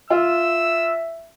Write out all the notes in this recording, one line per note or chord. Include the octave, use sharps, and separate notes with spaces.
F4 E5 E6